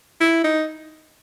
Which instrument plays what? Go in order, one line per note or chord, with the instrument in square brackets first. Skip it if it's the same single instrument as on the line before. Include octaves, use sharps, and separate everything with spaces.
[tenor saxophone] E4
D#4